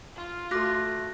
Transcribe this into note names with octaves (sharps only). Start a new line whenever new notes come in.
F4
A3 F#4 A4 D6 F#6 A#6